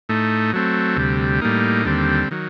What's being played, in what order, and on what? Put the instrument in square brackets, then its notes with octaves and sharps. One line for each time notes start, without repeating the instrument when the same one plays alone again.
[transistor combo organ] A2 A3 D#4
F#3 A3 C4
D2 C3 G3
A2 G3 A#3 D#4
D#2 D3 G3 C4
D#3 F#3